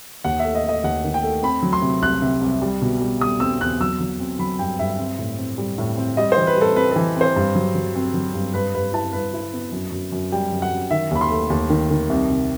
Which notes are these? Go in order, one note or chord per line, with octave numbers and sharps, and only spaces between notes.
D#2 F#5
A3 E5
D#5
A3
D#5
D#2 F#5
D#3
G5
A3
C4 B5
F#3
C6
C3
C2 F#6
C3
C2
G3
B2
G3
G3 D#6
C4 E6
E2 F#6
F#3 E6
F#3
C4
F#3 B5
G2 G5
G2 E5
C4
A2
C4
G3
A2
C4
G3 D#5
C5
E3
B4
G3
A4
C4 B4
E3 A4
C4
C5
G2
F#3
F#3
C4
F#3
G2
G2 B4
G2 B4
E4 A5
G2 B4
E4
B3
F#2
F#2
F#2
G3 G5
F#2
F#5
F#2
D#3 E5
D#2 B5
C6
A3
D#2
D#3
D#3
C2
C3